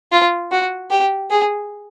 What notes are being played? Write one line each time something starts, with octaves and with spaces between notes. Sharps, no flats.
F4
F#4
G4
G#4